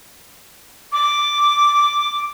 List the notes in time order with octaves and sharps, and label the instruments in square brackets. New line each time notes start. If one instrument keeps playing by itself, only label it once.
[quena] D6